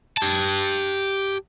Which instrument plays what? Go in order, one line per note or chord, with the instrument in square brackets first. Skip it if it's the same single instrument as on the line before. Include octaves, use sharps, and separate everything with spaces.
[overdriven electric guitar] G4 A5